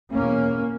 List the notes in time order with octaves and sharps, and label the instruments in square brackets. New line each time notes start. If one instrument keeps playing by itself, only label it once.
[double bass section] E2 B2 A#3 C#4